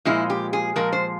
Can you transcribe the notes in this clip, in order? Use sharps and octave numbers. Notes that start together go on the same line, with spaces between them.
A#2 F3 G#3 E4
G4
G#4
A#2 F3 G#3 A#4
C5